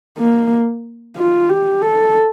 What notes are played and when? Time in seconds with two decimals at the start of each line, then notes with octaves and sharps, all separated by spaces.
0.18 A#3
1.17 F4
1.49 G4
1.82 A4